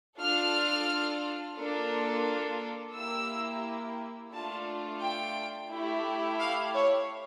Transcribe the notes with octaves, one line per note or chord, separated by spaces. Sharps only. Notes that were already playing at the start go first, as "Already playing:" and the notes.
D4 F4 A4 F6
A#3 D4 F4 A4
A#3 E4 G4 E6
A3 D4 F4 A5
G5
A3 E4 G4
F5
C#5